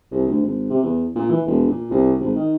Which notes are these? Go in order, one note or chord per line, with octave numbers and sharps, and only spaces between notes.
C2
D2
G#1
C3
E2
A#2
E3
E1
A#2
C2
G#1
D#3